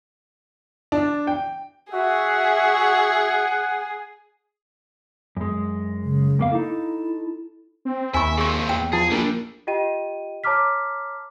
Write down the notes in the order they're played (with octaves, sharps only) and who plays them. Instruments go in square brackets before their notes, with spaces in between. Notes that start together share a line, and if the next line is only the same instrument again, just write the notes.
[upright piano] D4
G5
[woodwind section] F#4 E5 [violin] G#4 [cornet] F#5
[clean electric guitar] F#2 G#3
[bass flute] C#3
[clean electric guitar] F2 A#3 F5
[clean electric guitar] D#4 A4 [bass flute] E4
[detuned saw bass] C4
[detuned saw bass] D#2 [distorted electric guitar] E5 [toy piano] G#5 B5 C#6
[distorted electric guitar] A#2 C4 [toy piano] G#4 C#6
[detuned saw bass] E2 [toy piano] G5
[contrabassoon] F3 [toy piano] E4 A5 [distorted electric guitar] G#4
[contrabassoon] A#1 [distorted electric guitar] D3 G3
[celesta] F4 G4 D#5 G5 D#7
C#5 A5 A#5 D6 F6 B6